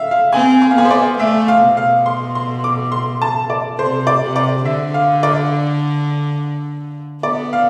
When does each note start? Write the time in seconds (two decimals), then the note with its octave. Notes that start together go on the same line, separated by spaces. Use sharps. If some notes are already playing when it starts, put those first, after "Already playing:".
Already playing: E5 F5
0.11 F5
0.33 C4 G#5
0.62 G#5
0.71 F5
0.76 B3 G#5
0.85 C5
0.90 D5
1.19 A3 E5
1.48 F5
1.63 B2
1.77 F5
2.06 C6
2.35 C6
2.64 D6
2.92 C6
3.22 A5
3.50 D5
3.79 C3 C5
4.07 D5
4.22 C3
4.36 D5
4.65 D3 E5
4.94 F5
5.23 D5
7.23 B3 D5
7.53 F5